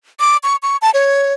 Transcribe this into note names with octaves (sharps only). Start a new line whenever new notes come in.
D6
C#6
C#6
A5
C#5